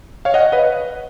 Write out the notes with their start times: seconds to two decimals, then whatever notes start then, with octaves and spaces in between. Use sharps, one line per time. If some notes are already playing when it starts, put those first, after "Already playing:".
0.25 C#5 F5
0.34 D#5 F#5
0.52 B4 D#5